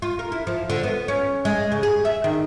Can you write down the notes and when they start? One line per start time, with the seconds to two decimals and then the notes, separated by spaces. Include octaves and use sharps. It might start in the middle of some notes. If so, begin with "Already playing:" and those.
0.02 F4
0.19 A#4
0.32 E4
0.47 F3
0.70 D3
0.84 B3
1.08 C#4
1.45 G#3
1.72 C#3
1.83 G#4
2.05 E5
2.24 D#3